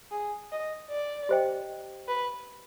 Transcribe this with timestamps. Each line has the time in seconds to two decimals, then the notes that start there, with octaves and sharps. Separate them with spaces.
0.11 G#4
0.51 D#5
0.90 D5
1.29 G4 C5 D#5 G5
2.08 B4